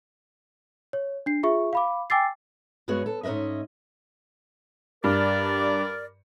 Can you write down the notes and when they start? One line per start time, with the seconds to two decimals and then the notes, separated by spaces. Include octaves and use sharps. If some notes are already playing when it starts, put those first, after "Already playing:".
0.93 C#5
1.26 D4 C7
1.43 F4 G#4 E5 C#6
1.73 F5 B5 D6
2.10 G5 G#5 D6 E6 A6 C7
2.88 G2 G#3 B3 F#4 G#4 C#5
3.06 A4
3.23 G#2 C#4 B4 D#5 E5
5.04 G2 A#4 D5